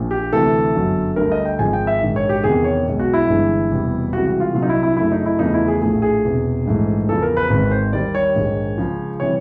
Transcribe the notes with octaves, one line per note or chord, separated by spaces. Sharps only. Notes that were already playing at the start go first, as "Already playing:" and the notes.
Already playing: A#1 A#2 F3
G4
D2 C3 E3 A3 A4
G1 F#2 D3 F#3
D2 D3 G3 A#4
D#5
G5
G#1 G#2 F3 G#3 G#5
G5
E5
A#1 G#2 D#3
C#5
G4
E2 C3 D#3 G#4
C#5
B1 B2 G#3
F#4
E4
G1 G2 E3 G#3
F1 E2 B2 G3
C#2 C3 E3 G3 F#4
F#4
F4
C2 A#2 F#3 F4
D#4
E4
E4
F#2 C#3 F#3 A3 E4
D#4
E4
E2 C#3 F3 A3 D#4
E4
G#4
A#1 A2 F3 A3 G#4
G#4
E1 E2 C3
A#1 G#2 E3 A3
E2 C#3 F3 A4
A#4
B4
G#1 G#2 D#3 B4
C5
D#2 D#3 G3 D5
C#5
A#1 G#2 D#3 G#3
C#2 C#3 F3
C3 E3 G3 C#5